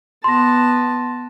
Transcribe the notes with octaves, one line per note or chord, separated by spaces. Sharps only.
B3 A5 C6 A#6